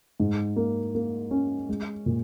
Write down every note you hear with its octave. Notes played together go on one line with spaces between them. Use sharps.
G#2
A#3
A#3
C#4
G#3
A#2